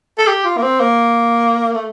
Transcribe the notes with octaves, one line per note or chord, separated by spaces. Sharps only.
A4
G4
F4
A#3
C4
A#3
A3